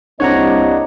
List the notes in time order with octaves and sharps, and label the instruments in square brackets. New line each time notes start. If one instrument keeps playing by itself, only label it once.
[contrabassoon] C2 [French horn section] G3 A#3 D#5 [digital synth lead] D4 [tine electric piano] C#5 F#5 A#5